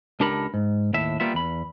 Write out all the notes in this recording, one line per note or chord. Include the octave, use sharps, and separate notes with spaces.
C#2 D4 G4 A4 A#4 B5
G#2
D#2 A2 E5
G3 A#3 B3 F4 E5
E2 B5